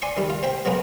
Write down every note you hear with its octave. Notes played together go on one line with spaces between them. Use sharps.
D5 G#5 C6 C#6
D#3 G3
F4
C5 G5 B5
B2 F#3 G#3 A#3 B3